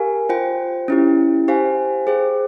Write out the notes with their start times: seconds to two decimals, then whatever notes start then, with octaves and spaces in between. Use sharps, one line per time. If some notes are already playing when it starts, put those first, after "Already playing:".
Already playing: G4 A#4 F5 G#5
0.29 F4 C5 G5
0.88 C#4 E4 G4
1.48 G4 C5 F5 G#5
2.07 G#4 C5 G5